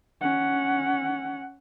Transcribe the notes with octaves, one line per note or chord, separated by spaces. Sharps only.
C#4 F#5